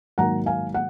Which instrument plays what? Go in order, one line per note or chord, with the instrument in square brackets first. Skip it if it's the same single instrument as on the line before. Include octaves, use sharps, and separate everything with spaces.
[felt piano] G#2 D#3 F#3 A#3 F#5 A#5
F5 G#5
F#5